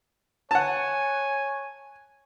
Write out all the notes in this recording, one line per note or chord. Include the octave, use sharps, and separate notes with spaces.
C#5 F#5 G#5 A5